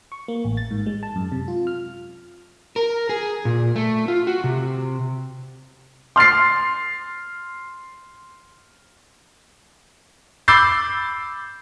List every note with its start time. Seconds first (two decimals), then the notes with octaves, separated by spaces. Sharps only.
0.12 C#6
0.28 A#3
0.45 A1
0.57 A6
0.71 G#2
0.86 G#3
1.03 A5
1.16 F#2
1.32 C3
1.48 F4
1.67 F6
2.76 A#4
3.09 G#4
3.45 A#2
3.76 A3
4.08 F4
4.27 F#4
4.44 C3
6.16 C6 F6 A6 C7
10.48 B5 D6 E6 G6 A6 C7